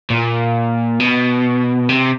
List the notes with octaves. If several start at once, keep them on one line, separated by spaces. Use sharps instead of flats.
A#2
B2
C3